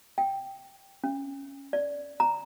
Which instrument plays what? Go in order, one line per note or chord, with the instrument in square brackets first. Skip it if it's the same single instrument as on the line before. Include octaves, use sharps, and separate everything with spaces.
[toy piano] G5
C#4
D5
A#5